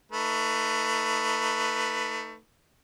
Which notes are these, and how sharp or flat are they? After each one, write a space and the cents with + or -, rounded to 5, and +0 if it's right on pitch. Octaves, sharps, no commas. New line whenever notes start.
A3 +20 D#4 +0 B4 +0